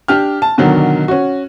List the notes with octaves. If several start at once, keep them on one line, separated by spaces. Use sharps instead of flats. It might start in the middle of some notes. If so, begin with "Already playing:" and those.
D4 G4 F6
A5
B2 D3 D#3 F#3
C#4 F#4